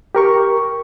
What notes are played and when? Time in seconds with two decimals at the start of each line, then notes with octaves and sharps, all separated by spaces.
0.15 G4 A#4 C#6